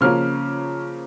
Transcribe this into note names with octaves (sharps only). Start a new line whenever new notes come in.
C#3 F3 A#3 C#4 F4 F6